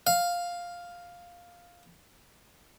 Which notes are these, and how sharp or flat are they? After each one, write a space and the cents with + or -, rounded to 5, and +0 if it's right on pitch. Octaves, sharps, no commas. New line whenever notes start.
F5 +5